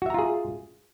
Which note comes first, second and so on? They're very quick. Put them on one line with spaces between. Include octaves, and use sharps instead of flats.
F#4 E5 A#5 F4 G#4